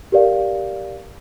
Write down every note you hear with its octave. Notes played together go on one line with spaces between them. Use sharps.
G4 A#4 B4 D5 F5